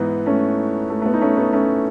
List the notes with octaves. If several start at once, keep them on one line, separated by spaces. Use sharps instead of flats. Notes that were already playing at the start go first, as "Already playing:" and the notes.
Already playing: G#2 E3 B3 D#4
A3 C#4
A3
A3
B3
D#4
A3 C#4
B3 D#4
A3 C#4